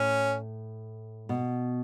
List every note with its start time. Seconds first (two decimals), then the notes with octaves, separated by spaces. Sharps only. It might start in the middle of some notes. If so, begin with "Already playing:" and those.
Already playing: A2 C#4
1.29 B2